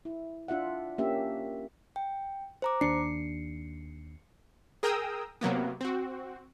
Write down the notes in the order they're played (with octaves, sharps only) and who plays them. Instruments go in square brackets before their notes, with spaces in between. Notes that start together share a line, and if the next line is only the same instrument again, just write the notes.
[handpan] E4
D4 F4 E5 F#5
A#3 C#4 D4 G4 E5
[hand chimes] G5
C5 A#5 D6
[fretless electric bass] D#2 D4 [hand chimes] C7 C#7
[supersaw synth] G#4 A#4 G5 A#5 D#6 E6
C3 F#3 A#3 B3
C4 F#4